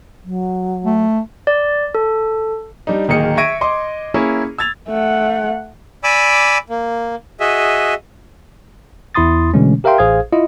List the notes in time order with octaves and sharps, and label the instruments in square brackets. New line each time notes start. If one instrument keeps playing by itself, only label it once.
[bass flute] F#3
[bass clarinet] A3
[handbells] D5
A4
[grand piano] G3 D4 D#4
D1 D#3 A#3 G#4 D#5 C#7
E5 C#6 G#6 A#6 D7 D#7
D#5 C6 D6
A#3 C#4 E4 G#4 C#5
E6 G#6 A6 F7
[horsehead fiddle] A3 F#5
[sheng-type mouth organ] D5 G#5 B5 D6 E6
A#3
F#4 G#4 D#5 E5
[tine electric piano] E2 E4 B5 C6 D#6 A6
B2 D3 E3 G#3 A3 C#4
G4 A#4 E5 F5 G5 C6
A1 G#4 C5 F5 D#6 G#6
E4 F4 D#5